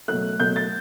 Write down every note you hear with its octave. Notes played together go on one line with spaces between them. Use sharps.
B2 F#3 A3 F#6
B2 F#3 A3 G6
A6